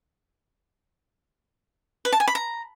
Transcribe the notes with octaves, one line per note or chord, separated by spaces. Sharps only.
B4
A5
G#5
B5
A#5